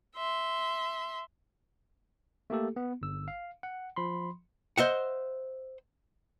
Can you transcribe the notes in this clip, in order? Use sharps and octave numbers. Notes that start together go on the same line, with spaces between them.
E5 C6
A3 A#3 G4 A4
B3
G1 E6
F5
F#5
F3 B5 C6
C5 D#5 E5 F#5